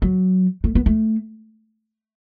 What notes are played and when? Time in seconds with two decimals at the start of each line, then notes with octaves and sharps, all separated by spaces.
0.02 F#3
0.64 A3
0.75 B3
0.86 A3